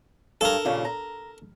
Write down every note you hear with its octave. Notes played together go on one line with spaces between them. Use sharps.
G2 A4 A#4
D#2 A#2 C#3
A#5